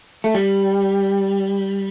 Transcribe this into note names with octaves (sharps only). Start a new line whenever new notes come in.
A3
G3